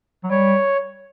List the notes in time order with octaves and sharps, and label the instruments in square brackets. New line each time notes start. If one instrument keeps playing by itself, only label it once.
[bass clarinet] F#3
[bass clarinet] G3 [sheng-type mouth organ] C#5